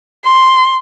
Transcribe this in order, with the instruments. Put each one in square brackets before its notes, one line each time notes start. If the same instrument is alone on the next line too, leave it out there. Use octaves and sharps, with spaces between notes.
[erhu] C6